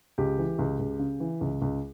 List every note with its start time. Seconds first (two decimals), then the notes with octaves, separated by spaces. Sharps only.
0.18 C#2 G4
0.38 E3
0.59 C#2
0.79 C#2
0.99 C#3
1.20 E3
1.41 C#2
1.62 C#2